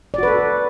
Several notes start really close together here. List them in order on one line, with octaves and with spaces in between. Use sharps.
D5 F#4 B4 A4